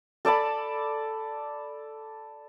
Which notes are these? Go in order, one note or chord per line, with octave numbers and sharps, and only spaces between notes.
A4 D5 A5 B5